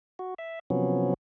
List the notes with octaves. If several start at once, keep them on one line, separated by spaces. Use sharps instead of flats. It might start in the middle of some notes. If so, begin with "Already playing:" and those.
F#4
E5
C3 F3 F#3 B3 C#4